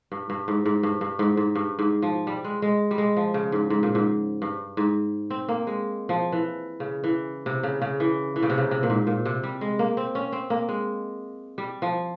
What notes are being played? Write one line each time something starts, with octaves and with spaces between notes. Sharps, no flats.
G2
G2
G#2
G#2
G2
G2
G#2
G#2
G2
G#2
F3
G3
G#3
G#3
G3
G#3
F3
C#3
G#2
G#2
A#2
G#2
G2
G#2
C4
A#3
G#3
F3
E3
C#3
E3
C3
C#3
C#3
E3
E3
C#3
C3
C#3
C3
A#2
G#2
A#2
C3
G3
G#3
A#3
C4
C#4
C4
A#3
G#3
G3
F3